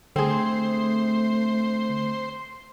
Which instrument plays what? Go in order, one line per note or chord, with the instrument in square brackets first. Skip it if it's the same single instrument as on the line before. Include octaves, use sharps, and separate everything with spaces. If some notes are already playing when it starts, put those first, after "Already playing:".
[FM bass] D3 [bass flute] A3 [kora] C4 G#4 [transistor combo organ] C5